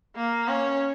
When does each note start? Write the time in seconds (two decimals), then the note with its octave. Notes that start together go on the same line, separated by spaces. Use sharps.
0.16 A#3
0.48 C#4